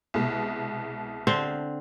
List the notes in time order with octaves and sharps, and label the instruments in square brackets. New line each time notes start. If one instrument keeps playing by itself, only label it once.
[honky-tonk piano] C2 B2 G#3
[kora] D3 C4 C5